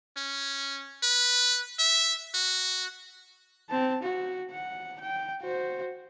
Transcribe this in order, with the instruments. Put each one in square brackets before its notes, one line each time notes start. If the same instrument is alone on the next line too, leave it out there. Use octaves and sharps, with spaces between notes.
[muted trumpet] C#4
B4
E5
F#4
[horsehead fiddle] C4 A5
F#4
F#5
G5
F#4 C5